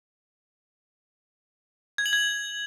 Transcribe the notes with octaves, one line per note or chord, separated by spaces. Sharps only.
G#6
F#7
G#6